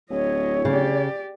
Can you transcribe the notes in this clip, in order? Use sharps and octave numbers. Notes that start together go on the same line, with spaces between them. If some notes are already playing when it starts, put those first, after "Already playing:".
D1 E4 C#5 D#5
C#3 G4 D5